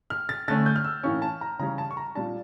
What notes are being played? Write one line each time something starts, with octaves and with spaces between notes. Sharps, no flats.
F6
A6
D3 A3 C#4 A6
G6
F6
E6
A2 E3 A#3 C#4 C#6
A5
A#5
C#3 E3 G3 C#4 A#5
A5
C#6
A#5
A#2 G3 D4 A5